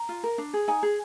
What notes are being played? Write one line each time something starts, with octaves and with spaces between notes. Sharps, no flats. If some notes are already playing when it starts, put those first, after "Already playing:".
Already playing: A#5
F4
A#4
D4
G#4
D#4 G#5
G#4